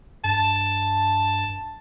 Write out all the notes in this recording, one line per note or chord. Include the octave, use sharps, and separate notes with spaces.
G2 A5